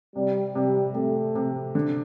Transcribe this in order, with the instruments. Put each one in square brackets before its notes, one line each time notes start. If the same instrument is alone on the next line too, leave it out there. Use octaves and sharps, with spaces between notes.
[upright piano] C3 [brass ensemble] G3
[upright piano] C3 [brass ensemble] G3
[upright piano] C3 [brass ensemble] A3
[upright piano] C3
D3